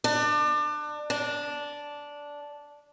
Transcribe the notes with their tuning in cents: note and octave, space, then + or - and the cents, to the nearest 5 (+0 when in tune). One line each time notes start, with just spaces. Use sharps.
D4 +30
D4 -10